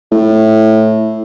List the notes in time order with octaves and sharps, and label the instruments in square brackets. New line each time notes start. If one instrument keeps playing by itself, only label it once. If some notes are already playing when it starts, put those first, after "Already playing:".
[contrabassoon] A2